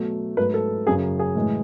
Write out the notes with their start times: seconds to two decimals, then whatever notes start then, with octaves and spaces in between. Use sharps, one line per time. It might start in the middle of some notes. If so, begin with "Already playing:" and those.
Already playing: B2 F#3 A3
0.37 G#2 F#3 A3 B4
0.54 A4
0.86 F#2 C#3 F#3 G#4
1.19 G#4
1.35 A2 E3 G#3